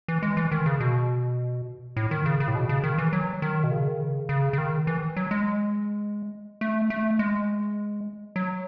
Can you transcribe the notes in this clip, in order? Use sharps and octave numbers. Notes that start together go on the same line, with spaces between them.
E3
G#3
E3
D#3
C#3
B2
A2
D#3
C#3
C#3
A2
B2
C#3
D#3
E3
F#3
D#3
B2
C#3
D#3
C#3
C#3
C#3
D#3
E3
F#3
G#3
A3
A3
G#3
F#3